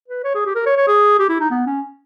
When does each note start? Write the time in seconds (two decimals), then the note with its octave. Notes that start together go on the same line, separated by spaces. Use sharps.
0.08 B4
0.24 C#5
0.35 G#4
0.46 G4
0.55 A#4
0.66 C#5
0.77 C#5
0.88 G#4
1.19 G4
1.29 E4
1.40 D#4
1.51 B3
1.67 C#4